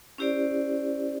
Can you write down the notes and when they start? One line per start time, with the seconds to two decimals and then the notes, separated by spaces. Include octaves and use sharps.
0.18 C#4 E4 G4 C5 D5